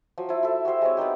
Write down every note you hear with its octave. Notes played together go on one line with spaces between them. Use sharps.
F3 F#3
F3 E4
E4 A4
F#4 G4 C5 E5
G#3 C4 C#5
B3 C4 D#4 G4